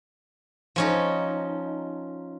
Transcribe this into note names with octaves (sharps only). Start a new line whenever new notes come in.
F3 C#4 D#4